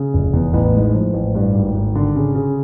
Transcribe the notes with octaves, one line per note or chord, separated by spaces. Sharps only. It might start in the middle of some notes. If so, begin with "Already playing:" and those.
Already playing: C#3
F1
E2
A1
G#2
F3
A1
G2
G#1
G#1
D3
C#3
C#3